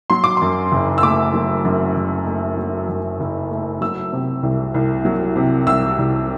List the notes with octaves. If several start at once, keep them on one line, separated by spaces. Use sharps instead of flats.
F#3 C6
D6
F#2 C6
F#1
E6
A3 D6
F#3
F#2
F#1
A3
F#3
F#2
F#1
A3
F#3 E6
C3
C2
C2
F#3
C3
C2 E6
C2